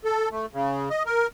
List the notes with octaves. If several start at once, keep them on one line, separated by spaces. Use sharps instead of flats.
A4
A3
C#3
D#5
A#4